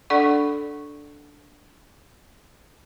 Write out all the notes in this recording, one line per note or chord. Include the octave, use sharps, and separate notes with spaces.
D4 A4 D5 F#5 C#6